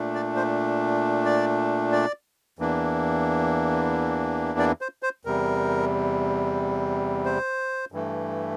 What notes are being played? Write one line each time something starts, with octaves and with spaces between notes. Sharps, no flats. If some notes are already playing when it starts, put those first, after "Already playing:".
Already playing: A#2 A3 D4
D5
C5
D5
D5
E2 E3 A#3 D4
D5
C5
C5
E2 C3 G3 A#4
C5
G2 E3 A3